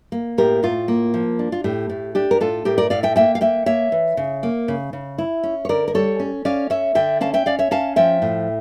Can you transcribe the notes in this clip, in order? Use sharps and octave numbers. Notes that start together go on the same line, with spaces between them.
A#3
A2 G4 A#4
A2 F4
A#3
F3
D4
F4
A2 G4
A2
D4 G4
A#4
A2 F4 A4
A2 G4 A#4
A#4 D5
A2 D5 F5
E5 G5
A#3 E5 G5
F5
A#3 E5 G5
A#3 C#5 E5
E3
C#3
A#3
C#3
C#3
E4
C#4
C#5
D3 A#4 D5
A#4
G3 A4 C#5
C#4
C#4 D5 F5
C#4 C#5 E5
D3 E5 G5
C#4 F5 A5
E5 G5
C#4 D5 F5
C#5 E5
C#4 F5 A5
F3 E5 G5
A2